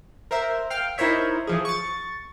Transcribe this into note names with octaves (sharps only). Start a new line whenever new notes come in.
A#4 C5 E5
F5 G5 F6
D#4 E4 A#4 C5 C#5 E5
E3 F3 G#4
C#6 A6